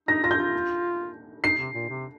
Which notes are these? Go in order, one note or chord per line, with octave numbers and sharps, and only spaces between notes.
D#4 A#6
F4 A#6
G6
F4
D#4 C7
C3
A#2
C3